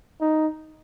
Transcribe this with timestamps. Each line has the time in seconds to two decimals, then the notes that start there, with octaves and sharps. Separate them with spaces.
0.20 D#4